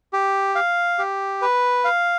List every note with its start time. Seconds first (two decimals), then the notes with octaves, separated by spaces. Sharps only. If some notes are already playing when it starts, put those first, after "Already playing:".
0.13 G4
0.55 F5
0.99 G4
1.42 B4
1.84 F5